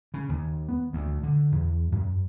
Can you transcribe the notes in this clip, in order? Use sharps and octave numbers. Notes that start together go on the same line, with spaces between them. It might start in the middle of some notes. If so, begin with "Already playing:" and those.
C#3
D#2
B3
D2
D3
E2
F#2